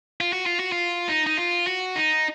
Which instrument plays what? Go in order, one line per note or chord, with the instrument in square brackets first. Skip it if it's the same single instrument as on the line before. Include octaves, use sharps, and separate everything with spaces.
[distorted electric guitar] F4
F#4
F4
F#4
F4
D#4
D#4
F4
F#4
D#4